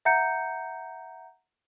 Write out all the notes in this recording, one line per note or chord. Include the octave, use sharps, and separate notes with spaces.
E5 F#5 A#5 G6 C#7